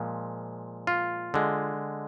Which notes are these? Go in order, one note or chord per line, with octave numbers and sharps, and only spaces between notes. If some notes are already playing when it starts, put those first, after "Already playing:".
Already playing: A#2 F3 G#3
F4
D3 G#3